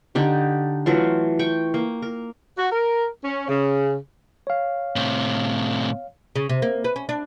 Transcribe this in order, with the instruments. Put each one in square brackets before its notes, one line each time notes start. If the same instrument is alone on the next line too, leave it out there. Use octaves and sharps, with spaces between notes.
[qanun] D3 D#4 G4
E3 F#3 A3 F4
G5 C#6
A#3
A#4
[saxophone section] F#4
A#4
C#4
C#3
[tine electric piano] C#5 F5
[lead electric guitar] A2 C3
[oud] C#3
C3
A#3
B4
C#4
D4